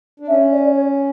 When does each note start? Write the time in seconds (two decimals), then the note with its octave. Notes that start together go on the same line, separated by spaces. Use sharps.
0.20 D4
0.28 C#4 E5
0.51 D5
0.74 C#5